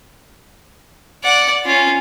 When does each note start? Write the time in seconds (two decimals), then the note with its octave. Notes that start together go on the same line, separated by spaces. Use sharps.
1.23 D5 F#5
1.65 C#4 F4